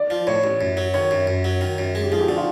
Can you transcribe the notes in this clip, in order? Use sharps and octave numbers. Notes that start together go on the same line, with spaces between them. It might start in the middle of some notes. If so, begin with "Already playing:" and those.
Already playing: D5
F3
A2 C#5
A1
F#2
F#3
D#3 C#5
F#2
F#2
F#3
D#3
F#2
G#3
G4
F3 G#4
G4
D3 F#4
F4